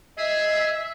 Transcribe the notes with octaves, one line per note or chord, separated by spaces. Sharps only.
G#4 D#5 E5